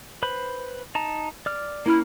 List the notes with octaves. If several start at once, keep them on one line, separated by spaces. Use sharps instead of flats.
B4 C5 B5
D#4 A5 A#5
D5 F6
A#3 C#4 E4 F6